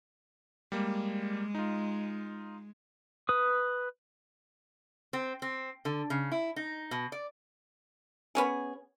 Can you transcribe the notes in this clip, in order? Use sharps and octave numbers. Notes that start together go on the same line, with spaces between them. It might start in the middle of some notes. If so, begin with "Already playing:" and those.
G3 G#3 A#3
D#4 F4
B4 D#6
C4
C4
D3
C#3
E4
D#4
B2
D5
B3 C#4 G#4